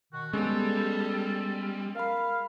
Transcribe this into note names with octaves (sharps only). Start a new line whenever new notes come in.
B2 D#3 F#4
G3 G#3 B3 C#4 A4
A#4 F5 B5